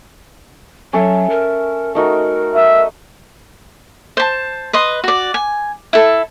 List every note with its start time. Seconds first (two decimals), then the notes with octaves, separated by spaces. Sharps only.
0.93 F#3 C#4 A4 E5
1.30 A#4
1.95 A3 D#4 F#4 A#4
2.56 D#5 E5
4.17 C5 A5
4.73 B4 D#5 C6
5.04 F#4 D5
5.34 G#5
5.93 E4 A4